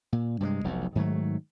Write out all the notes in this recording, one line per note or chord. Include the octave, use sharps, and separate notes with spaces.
A#2
G2 C3 F#3 G#3
F1 B1 F2
G#2 D#3 F#3 A3